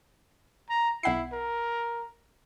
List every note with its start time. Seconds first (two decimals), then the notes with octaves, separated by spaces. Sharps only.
0.70 A#5
1.03 B1 E4 F#5 C7
1.32 A#4